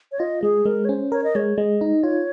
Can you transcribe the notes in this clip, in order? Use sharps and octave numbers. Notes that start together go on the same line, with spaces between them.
C#5
F4 D#5
G#3 G#4
G#3 A#4
C#5
C#4 C5
A#4 C#5
D#5
G#3 C#5
G#3 D#5
D#4
F4 C#5